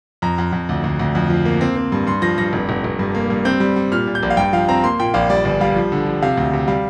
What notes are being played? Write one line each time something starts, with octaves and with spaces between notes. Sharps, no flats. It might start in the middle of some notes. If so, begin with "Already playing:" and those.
F2 A#5
F2
F2
D2
D2
D2
F2
F3
A#3
C4
C4
G2
G2 C6
F3 A#6
G2 A#6
F1
F1
F1
G2
A#3
G2
C4 G6
G3
G3
A#2 F6
A#2
G6
A#1
F5
G2 G5
F3 F5
C4 A#5
A#3 C6
A#2 G5
A#1 F5
G3 D5
G1 D5
G3 F5
F3
D3
F3
C3 F5
D2
C3
G3 F5